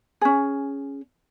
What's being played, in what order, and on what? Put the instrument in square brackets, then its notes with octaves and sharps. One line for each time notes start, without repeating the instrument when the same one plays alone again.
[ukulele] C#4 G#4